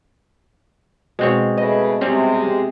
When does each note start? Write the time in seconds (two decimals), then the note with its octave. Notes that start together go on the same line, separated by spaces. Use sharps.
1.19 B2 G#3 C4 C#5
1.58 C#3 A3 B4 D#5
2.01 C3 G3 G#3 C4 C#4